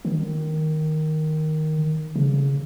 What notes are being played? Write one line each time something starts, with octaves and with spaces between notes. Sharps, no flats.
D#3
C#3